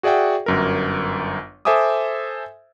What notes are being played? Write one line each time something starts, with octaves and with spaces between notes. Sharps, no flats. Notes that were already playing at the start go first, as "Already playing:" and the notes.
F#4 G#4 D5 E5 F#5 G5
G1 F#2 A#4
A4 C5 E5 G#5 D6 D#6